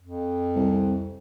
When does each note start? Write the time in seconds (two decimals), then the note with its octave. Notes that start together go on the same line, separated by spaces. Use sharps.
0.02 F2
0.55 C2